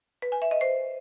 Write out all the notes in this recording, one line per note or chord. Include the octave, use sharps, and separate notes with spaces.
B4
G#5
E5
D#5
C5